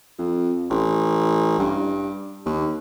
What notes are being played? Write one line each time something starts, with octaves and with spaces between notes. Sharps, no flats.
F2
A1
G2
D#2